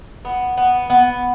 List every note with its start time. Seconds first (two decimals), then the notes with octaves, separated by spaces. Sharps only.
0.25 B3
0.57 B3
0.90 B3